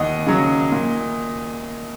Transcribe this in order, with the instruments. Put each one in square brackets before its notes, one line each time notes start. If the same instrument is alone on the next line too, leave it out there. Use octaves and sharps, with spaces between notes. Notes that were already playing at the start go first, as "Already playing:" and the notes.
Already playing: [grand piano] D#2 [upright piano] D#5 F#5
[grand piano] C#3 F#3
A#2